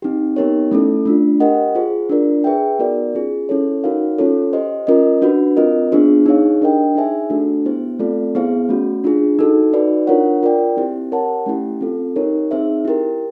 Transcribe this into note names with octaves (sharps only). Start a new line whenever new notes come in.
C4 D#4 G4
B3 D#4 G4 A#4 C#5
A3 C#4 E4 A4
A3 D4 F4
G4 A#4 D#5 F#5
F4 G#4 C5
D4 F4 A#4 D5
G#4 B4 E5 G5
B3 D#4 F#4 A#4 D5
C#4 F4 G#4
C#4 E4 A4 C#5
D#4 F#4 A#4 C#5 F5
C#4 F4 A4 C#5
G4 C5 D#5
C#4 F4 A#4 D#5
D4 F#4 B4
C4 F4 A#4 D#5
B3 D4 F4 G#4 C5
D#4 G#4 C#5 F5
D4 G4 A#4 D#5 G5
D#4 G#4 C5 E5 G#5
A3 D4 F#4 A4
B3 E4 G4 C5
A3 C4 F4 A4 D5
B3 E4 G#4 C5 F5
A3 C#4 F#4
D4 F4 G#4
D#4 F#4 A4
D#4 F#4 B4 D5
D4 F4 A#4 C#5 F#5
F4 A#4 D5 G5
C4 E4 G4 C5
G4 A#4 C#5 F#5 A5
A3 C#4 E4 G4
C4 F4 A4
D#4 G4 A#4 C#5
C4 D#4 G#4 C5 E5
E4 G4 A#4